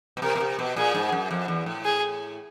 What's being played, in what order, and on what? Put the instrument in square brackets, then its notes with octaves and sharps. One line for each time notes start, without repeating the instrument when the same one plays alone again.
[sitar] B2
[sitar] C3 [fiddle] A#4
[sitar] B2
C3
B2
[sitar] A#2 [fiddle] G#4
[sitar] G#2
F#2
F2
E2
A2
[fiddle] G#4